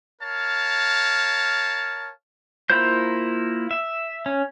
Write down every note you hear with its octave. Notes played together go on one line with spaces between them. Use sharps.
A#4 C#5 F5 A5
A#3 E4 F4 C5 G6
E5
C#4